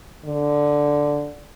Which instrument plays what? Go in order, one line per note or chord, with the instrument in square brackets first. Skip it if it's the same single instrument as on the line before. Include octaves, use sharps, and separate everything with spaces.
[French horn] D3